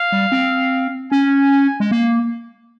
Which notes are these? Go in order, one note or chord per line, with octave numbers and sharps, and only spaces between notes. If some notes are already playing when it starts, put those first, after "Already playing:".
Already playing: F5
G3
C4
C#4 G#5
G#3
A#3